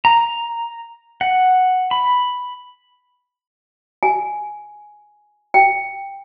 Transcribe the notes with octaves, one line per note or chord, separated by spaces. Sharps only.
A#5
F#5
B5
G#5
G5